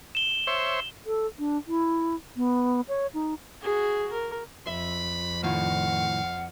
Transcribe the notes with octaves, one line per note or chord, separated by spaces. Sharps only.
E7 G7
C5 C#5 E5
A4
D4
E4
B3
C#5
D#4
F#4 G#4
A#4
F2 E5 B5
A2 D#3 F4 F5 F#5